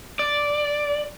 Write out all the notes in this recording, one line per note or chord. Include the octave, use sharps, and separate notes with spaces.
D5